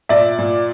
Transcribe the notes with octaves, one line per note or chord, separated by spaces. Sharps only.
A#2 D5 E5
A#2